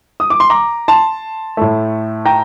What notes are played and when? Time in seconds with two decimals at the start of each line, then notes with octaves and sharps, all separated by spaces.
0.20 D#6
0.30 D6
0.40 C6
0.50 A#5 D6
0.88 A5 C6
1.57 A2 A3
2.25 G5 A#5